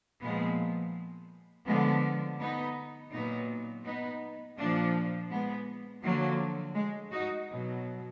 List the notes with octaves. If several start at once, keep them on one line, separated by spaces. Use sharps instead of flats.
A#2 F3 G#3 B3
D3 F3 G#3 B3
B3 D#4
A#2 F#3 B3 D#4
B3 D#4
A#2 F3 A#3 D4
G#3 B3
D3 F3 F#3 A#3
G#3
D#4 F#4
B2 F#3